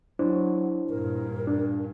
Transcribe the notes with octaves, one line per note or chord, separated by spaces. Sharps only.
F#3 D4 E4 C5
G2 A#2 A#4
D4